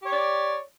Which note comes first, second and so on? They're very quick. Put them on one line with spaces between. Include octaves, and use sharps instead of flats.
G4 C#5 D5